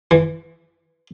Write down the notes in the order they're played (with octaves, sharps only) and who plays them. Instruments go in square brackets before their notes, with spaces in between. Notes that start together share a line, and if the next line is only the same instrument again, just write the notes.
[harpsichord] E3